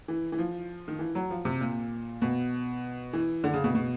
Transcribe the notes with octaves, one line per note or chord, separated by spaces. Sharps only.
E3
E3
F3
D#3
E3
F#3
F3
C3
A#2
B2
E3
D3
C#3
B2
B2